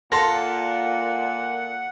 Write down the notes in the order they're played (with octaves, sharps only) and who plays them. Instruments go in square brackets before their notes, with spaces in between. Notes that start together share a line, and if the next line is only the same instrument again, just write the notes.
[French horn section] A#2 [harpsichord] A4 F5 [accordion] F#5 [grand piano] A5 C6 A#6